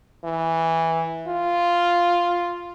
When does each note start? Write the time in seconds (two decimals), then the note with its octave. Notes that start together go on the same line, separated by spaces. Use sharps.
0.24 E3
1.28 F4